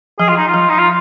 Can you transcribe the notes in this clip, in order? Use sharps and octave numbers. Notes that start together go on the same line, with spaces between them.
F3 G#4
F4
D#4
F4
F3
D#4
F4